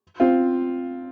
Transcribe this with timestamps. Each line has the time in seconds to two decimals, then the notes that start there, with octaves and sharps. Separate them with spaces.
0.20 C4 F4